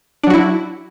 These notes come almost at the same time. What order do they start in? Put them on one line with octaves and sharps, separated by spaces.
D4 F#3 F#4 E4